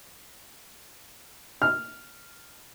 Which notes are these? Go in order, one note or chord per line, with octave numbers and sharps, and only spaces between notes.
F6